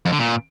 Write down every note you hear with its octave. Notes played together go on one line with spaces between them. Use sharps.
F2
D3
A#2